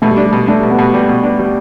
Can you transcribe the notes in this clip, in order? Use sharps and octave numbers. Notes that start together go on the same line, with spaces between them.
B2 A3
G3
D4
G3
B2
A3 D4
B2
B3
B2
G3
B2
D4
G3